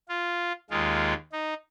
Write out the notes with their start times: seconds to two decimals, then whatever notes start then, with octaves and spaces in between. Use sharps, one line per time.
0.09 F4
0.70 D#2 D#3 G#3 F4
1.32 D#4